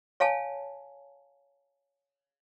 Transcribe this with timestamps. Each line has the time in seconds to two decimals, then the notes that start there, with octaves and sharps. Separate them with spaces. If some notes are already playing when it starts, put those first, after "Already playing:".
0.20 C#5 F5 G#5 A5